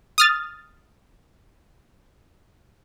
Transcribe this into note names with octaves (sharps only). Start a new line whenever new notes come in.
D#6 F6 A6